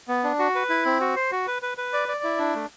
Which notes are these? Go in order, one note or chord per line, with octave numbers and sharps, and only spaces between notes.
B3
D4
F#4
B4
E4
C4
F#4
C5
F#4
B4
B4
B4
D5
D5
E4
D4
A3